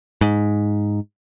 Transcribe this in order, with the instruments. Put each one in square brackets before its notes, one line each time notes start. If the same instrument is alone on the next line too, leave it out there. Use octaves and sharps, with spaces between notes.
[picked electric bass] G#2